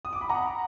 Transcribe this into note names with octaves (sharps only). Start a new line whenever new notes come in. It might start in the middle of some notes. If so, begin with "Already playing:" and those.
D#6
D6
B5
F#5 A#5